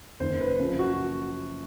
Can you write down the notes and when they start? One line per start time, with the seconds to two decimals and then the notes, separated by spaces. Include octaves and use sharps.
0.20 F#1 F#2 D#3 C5
0.41 B4
0.59 F#2 C#3 F3
0.79 F#4